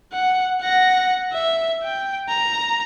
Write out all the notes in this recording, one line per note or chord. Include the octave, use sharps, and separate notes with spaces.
F#5
F#5 A#6
E5
G5
A#5